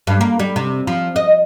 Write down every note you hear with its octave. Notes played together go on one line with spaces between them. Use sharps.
G2
A#3
G3
C3
F3
D#5